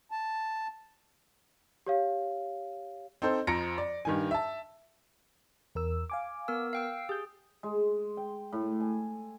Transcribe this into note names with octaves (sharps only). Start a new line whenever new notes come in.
A5
G4 C#5 F5
C4 D#4 A4 C5
F2 F3 A#5 A#6 C#7 D7
D5
G2 D#3 G#5
E5 A5
E2 A#4 E6
F5 G#5 D6
B3 A#4 E6
F5 G5 E6 C7
G4 G#4 G6
G#3
G5
A2
G#5